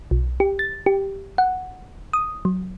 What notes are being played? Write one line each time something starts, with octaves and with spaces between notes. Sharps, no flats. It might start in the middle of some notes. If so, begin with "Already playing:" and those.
B1
G4
A6
G4
F#5
D#6
F#3